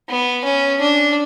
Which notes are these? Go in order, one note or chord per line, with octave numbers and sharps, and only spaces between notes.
B3
C#4
D4